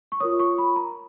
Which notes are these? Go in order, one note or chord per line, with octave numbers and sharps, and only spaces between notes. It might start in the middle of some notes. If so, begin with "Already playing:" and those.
C#6
F4 A#4 C#5 D#6
C#6
B5
A#5